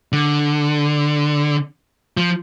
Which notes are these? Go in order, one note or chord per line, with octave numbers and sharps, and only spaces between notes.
D3
F3